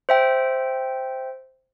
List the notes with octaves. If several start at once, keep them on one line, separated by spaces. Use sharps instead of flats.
C5 E5 G5